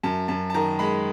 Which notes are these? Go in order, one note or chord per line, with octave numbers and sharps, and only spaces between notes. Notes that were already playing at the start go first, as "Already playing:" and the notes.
F#2 A5
F#2 A5
A5
D#3 A#5
G#3 B5